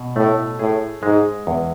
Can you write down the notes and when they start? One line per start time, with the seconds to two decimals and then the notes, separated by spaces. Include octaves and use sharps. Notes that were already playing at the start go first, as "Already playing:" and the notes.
Already playing: B2
0.16 A2 A3
0.59 A2 G#4
1.03 G#2 G#3
1.47 E2